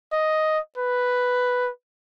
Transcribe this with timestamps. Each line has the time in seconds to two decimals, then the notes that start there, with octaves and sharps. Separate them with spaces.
0.13 D#5
0.78 B4